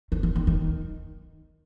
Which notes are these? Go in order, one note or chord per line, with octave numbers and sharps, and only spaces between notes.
D#3
E3
D#3
D#3